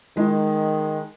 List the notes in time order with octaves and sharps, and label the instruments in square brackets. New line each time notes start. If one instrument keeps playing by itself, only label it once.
[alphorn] D#3 [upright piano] G#3 D#4